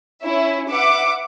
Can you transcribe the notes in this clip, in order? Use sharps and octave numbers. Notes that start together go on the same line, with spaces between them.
C#4 E4 E5
B4 E5 F#5 D6